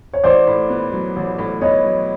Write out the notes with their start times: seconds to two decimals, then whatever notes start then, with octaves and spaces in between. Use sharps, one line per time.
0.13 C#5
0.24 A1 C5 D5
0.47 A2
0.70 B3
0.92 F#3
1.16 A1
1.38 A2
1.61 B3 C#5 D#5
1.85 F#3